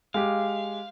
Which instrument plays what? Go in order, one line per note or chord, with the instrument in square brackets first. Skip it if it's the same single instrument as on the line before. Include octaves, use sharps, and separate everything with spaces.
[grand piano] G#3 G4 [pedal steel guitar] F5